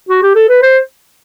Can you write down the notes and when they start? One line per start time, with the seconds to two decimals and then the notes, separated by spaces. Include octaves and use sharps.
0.09 F#4
0.22 G4
0.35 A4
0.49 B4
0.62 C5